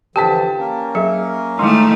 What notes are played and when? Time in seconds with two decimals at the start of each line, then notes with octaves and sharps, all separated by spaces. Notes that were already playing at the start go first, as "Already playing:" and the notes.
0.16 D3 E3 F3 G4 G5 A5 B6
0.58 A#3 C#4 A#4
0.95 F#3 G#4 E5
1.59 D#3 G#3 A3 E4 C6